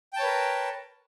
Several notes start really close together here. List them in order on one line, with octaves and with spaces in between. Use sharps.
G5 A5 C#5 B4 A#4